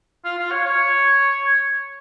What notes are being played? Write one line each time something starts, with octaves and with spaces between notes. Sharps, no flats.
F4
F4
C#5
C#5